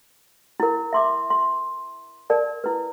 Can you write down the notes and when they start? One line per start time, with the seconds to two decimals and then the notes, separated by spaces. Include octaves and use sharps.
0.60 E4 A#4
0.93 E5 C6 D6
1.30 C6
2.30 A#4 D5 A5
2.64 E4 B4